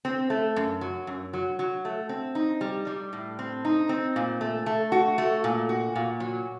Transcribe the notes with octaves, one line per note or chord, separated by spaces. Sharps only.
C4
A3
F#2
F#3
F#2
F#3
F#3
A3
C4
D#4
G3
G3
A2
C4
D#4
C4
A#2
A3
A3
F#4
A3
A#2
F#4
A#2
F#3